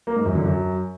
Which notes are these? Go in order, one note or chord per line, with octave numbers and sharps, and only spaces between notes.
A#3
G#2
F#2
D3
F#2